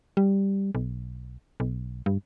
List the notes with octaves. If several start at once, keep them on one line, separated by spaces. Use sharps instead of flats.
G3
B1
B1
G2